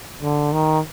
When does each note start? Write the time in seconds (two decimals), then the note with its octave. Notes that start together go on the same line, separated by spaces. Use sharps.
0.22 D3
0.53 D#3